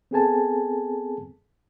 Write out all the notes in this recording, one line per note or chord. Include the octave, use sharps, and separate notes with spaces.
B3 C4 G#4 A4 G#5 A5